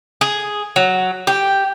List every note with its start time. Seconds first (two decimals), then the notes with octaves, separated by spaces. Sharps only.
0.21 G#4
0.76 F#3
1.27 G4